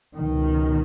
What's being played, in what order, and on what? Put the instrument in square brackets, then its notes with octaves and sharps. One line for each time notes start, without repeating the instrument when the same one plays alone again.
[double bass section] C#2 B2 D#3